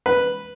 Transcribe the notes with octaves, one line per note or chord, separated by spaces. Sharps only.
B4